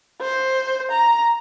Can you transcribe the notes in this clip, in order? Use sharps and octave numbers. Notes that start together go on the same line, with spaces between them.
C5
A#5